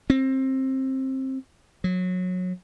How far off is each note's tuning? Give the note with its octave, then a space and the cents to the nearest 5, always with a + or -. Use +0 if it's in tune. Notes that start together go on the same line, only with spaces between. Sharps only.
C4 +20
F#3 -20